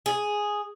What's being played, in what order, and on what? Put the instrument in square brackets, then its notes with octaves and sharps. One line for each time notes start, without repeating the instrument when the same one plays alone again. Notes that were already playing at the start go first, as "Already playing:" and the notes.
[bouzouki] G#4